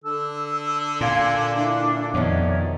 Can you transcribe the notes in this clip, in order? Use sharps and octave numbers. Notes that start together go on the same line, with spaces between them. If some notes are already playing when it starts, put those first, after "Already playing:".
D3 A4 E6
A#2 F5 G#5 C6
D4 E4 F4
F2 B2 D#3 C#5 D5 E5